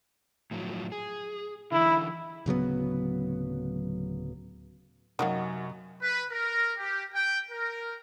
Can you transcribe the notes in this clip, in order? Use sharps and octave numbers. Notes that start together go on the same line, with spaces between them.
A2 F3 F#3
G#4
D3 E3 E4
D1 C#3 F#3 B3
F#2 C3 D#3 F#3 A#3 F#4 D#5
B4
A#4
G4
G5
A#4